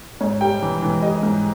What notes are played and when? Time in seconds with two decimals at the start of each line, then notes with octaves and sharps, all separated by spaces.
0.21 G#2 C#5
0.41 G3 G5
0.62 E3
0.82 E3
1.02 G3 D#5
1.23 G#2